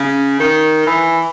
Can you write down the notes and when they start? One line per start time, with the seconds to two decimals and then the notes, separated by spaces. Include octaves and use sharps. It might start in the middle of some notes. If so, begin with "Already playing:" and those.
Already playing: C#3
0.40 D#3
0.87 E3